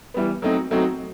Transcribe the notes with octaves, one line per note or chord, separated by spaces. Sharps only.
E3 G3 B3
F#3 A3 C4 D#4 F#4
F#3 A3 C4 D#4 F#4